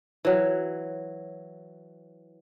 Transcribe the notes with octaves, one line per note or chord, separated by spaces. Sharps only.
E3 F#3